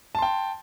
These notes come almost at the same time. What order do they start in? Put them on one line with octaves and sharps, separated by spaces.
A5 C6 G5